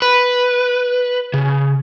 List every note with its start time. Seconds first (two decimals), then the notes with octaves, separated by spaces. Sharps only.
0.02 B4
1.34 C#3